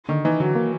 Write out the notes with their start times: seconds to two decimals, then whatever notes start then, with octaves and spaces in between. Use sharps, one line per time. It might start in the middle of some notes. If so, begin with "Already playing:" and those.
0.09 D3 D#3
0.25 E3 D#4
0.40 D3 F#3
0.55 A#3